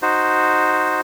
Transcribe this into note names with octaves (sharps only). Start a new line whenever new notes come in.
D#4 F#4 C5